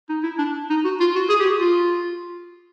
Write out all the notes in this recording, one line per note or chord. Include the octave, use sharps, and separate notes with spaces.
D#4
E4
D4
D#4
F#4
F4
F#4
G#4
G4
F#4
F4